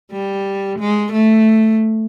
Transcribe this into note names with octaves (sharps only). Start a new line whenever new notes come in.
G3
G#3
A3